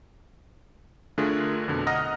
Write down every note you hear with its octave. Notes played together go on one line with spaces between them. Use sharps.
D3 A3 D4 F4 G#4 A#4
F2 B2 D3
D#5 F#5 A#5 D#6 F6 A#6